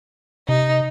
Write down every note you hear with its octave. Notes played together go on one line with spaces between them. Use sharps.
C3 D#4